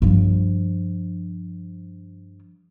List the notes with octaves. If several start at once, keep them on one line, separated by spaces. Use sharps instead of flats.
G2 F3